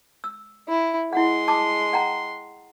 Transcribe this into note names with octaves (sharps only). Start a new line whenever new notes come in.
E6
E4
G#3 E4 F#5 C6
A5 D6 D#6
F#5 G5 A#5